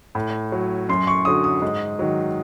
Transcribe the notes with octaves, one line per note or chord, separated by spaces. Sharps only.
A2
F#3
F#2 C6
C#6
D3 F#3 D#6
D#6
G#2
D#3 F#3